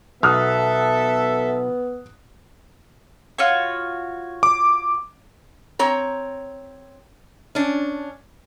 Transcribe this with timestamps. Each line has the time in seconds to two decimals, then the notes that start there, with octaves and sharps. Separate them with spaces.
0.23 B1 B3 A4 E5 D#6 F6 F#6
3.38 F4 F#4 C#5
4.43 D6
5.79 C4 C#5 A#5
7.55 C#4 D4